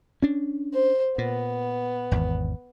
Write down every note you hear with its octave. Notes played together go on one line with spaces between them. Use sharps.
C#4 D4
C5
A#2 B3
G#1 E2